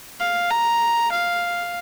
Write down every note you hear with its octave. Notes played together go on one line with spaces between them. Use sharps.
F5
A#5
F5